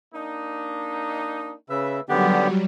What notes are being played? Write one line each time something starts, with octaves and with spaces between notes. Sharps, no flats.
A#3 D4 D#4
C#3 B4 E5
D3 D#3 F#3 G3 B3 C#4 D4 G4